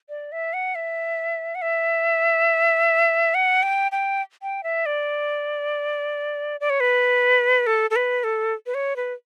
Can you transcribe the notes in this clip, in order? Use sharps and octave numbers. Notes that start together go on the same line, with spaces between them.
D5
E5
F#5
E5
F#5
E5
F#5
G5
G5
G5
E5
D5
D5
C#5
B4
A4
A4
B4
A4
B4
C#5
B4